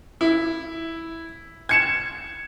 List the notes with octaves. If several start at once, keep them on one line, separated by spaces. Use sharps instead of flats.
E4
G#6 C#7 E7